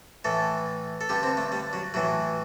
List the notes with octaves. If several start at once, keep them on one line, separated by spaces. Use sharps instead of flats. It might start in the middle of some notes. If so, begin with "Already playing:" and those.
A2 E3 A4
A4
G2 D3 G4
C4
A3
G3
F#3
A2 E3 F#3